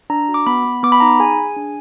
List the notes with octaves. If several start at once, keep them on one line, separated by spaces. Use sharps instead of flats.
D4 A#5
F#4
D6
B3 B5
B3
B3 D6
B5
D#4 A#5
B5
G#4 G#5
G#4
D4